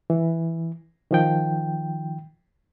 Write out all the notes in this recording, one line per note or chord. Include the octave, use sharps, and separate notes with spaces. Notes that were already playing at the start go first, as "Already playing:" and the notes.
E3
D#3 F3 G5